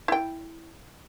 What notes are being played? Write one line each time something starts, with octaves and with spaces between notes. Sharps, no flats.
E4 G5